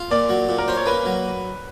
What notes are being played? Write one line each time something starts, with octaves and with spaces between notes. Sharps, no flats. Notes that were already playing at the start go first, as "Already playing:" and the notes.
Already playing: F4
A#2 D5
F#3
A#2
A#4
C#4 C5
C#5
A#3 B4
F#3